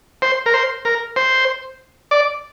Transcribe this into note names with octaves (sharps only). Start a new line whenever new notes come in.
C5
A#4
C5
A#4
C5
D5